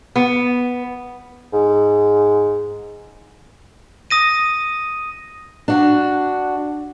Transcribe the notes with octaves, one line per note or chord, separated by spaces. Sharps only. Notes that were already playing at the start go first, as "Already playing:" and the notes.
B3
G#2
D#6 A#6 D#7
D4 F#4